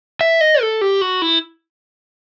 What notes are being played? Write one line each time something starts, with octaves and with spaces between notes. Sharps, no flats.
E5
D#5
A4
G4
F#4
E4